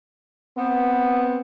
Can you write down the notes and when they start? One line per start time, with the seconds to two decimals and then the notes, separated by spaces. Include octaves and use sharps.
0.58 B3 C4